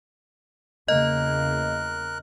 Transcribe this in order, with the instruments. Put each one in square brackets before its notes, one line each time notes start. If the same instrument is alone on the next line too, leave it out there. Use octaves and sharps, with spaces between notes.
[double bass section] E2 C#3 A#3 [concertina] A#4 F#6 [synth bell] D#5